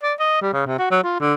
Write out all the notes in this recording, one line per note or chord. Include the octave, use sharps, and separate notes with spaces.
D5
D#5
G3
C#3
C3
F#4
F#3
F4
D3